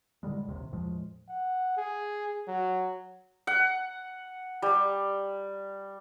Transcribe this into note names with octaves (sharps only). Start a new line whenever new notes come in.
A2 D3 G3 G#3
A#1 D#2 C3
E2 A2 F3 G#3
F#5
G#4
F#3
F#5
G3